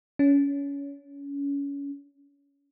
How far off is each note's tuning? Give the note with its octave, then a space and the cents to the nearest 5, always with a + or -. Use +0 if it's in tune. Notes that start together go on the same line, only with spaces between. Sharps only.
C#4 +25